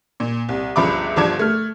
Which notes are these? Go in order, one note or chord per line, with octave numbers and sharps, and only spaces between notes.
A#2
C2
G1 C#2 F3 E5 B5 D6
G1 D3 F3 A5 D6 G#6
A3 F6